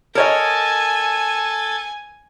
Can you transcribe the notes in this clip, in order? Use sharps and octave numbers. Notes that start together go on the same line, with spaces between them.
A4 A#4 C#5 D#5 G#5 A5 G#6